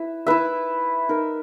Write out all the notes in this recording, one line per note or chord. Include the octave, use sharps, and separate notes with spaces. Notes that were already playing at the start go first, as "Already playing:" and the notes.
Already playing: E4 B4 E5
E4 B4 E5
D#4 A#4 E5